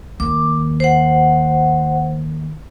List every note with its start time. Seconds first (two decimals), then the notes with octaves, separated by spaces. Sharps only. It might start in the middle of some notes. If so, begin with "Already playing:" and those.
0.20 D#2 D6
0.80 C5 F#5